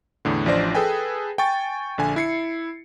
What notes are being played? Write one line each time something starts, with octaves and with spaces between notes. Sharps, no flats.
E2 A2 D3
A1 F3 D4 C5 D5 A#6
G#4 A4 B4 G5 G#5
G5 G#5 C#6 A6
A#1 D3 G#5
E4 C7 C#7